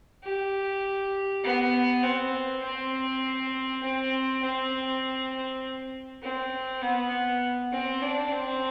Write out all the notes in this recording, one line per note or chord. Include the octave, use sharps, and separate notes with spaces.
G4
B3
C4
C4
C4
C4
C4
B3
C4
D4
C4